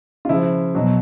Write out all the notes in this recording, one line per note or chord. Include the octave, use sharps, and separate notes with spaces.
F4
C#3 F3 E4
B2 F#3